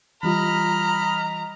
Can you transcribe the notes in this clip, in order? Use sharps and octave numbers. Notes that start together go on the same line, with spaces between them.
E3 G3 F4 D#5 A#5 B5 F6